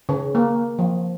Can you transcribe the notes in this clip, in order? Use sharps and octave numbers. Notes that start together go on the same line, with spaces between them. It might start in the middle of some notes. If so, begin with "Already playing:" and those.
C#3
A#3
F3